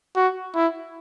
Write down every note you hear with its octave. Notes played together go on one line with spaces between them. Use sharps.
F#4
E4